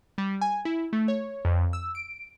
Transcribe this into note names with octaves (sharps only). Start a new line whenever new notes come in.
G3
G#5
E4
A3
C#5
F2
E6
D7